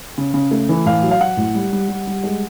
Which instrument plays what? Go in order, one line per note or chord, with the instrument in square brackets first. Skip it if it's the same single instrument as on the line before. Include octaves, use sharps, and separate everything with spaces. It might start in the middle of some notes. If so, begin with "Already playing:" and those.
[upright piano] C#3
C#3
A3
E3
A2 F5
F#3
F5
F#3 F#5
A2
G3
G3
G3
G3
G#3